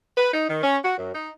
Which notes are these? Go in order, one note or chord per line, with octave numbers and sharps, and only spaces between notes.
B4
D#4
D#3
C#4
F#4
F#2
D#4